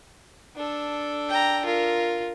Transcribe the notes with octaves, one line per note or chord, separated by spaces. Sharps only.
D4 A4
G5 A#5
F4 A#4